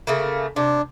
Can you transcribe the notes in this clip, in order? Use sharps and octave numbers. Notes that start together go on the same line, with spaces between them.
C#3 A3 A#3
C3 D4